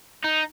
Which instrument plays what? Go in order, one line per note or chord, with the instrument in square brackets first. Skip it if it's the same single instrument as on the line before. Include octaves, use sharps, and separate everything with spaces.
[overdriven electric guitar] D#4